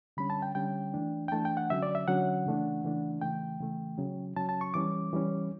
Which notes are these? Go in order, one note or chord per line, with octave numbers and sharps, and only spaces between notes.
D3 G3 C#4 B5
A5
G5
D3 G3 C#4 G5
E3 A3 D4
G5
E3 A3 D4 A5
G5
F#5
D3 F#3 C#4 E5
D5
E5
D3 F#3 C#4 F#5
C#3 E3 A3 D4
C#3 E3 A3 D4
C#3 E3 A3 G5
C#3 E3 A3
C#3 F#3 C#4
C#3 F#3 C#4 A5
A5
C#6
E3 G3 C#4 D6
E3 G3 C#4